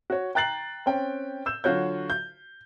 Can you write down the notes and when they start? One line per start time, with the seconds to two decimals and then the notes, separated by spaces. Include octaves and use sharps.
0.10 F#4 C#5
0.35 G5 A#5 F#6 A6 C7 F#7
0.86 C4 C#4 G5
1.46 E6 G6 E7
1.64 D3 F#3 F4 F#4 C#5 G6
2.10 G6